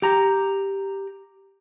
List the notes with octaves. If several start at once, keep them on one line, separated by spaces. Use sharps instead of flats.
G4 A#5